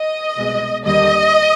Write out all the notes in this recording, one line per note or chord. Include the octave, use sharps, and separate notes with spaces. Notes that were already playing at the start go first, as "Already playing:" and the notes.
Already playing: D#5
C2 B2 G#3
D#2 D3 G3 D#5